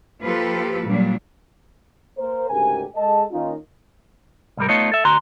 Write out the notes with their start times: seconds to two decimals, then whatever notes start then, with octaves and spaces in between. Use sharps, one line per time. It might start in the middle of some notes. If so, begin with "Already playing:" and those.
0.22 F3 A#3 F4 G4 A4 B4
0.87 A#2 F#3 G3 D4
2.18 A#3 A#4 C5
2.50 D2 G#2 C#3 G4 A#4 G#5
2.96 G#3 A4 D#5 A5
3.31 D#3 A#3 C#4 D#4 F4
4.57 C2 G#2 G3 A#4
4.69 A3 B3 D#4 F4 C#5 D#5
4.92 A4 E5
5.05 D2 F#4 A#5 C6